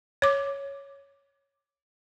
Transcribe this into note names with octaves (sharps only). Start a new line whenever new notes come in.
C#5 D6